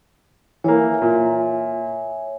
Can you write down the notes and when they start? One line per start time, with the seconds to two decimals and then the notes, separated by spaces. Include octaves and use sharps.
0.64 E3 A#3 C#5 E5 G#5
1.02 A#2